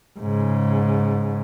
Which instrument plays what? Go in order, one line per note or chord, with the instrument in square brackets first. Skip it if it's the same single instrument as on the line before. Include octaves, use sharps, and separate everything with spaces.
[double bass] G#2 C#3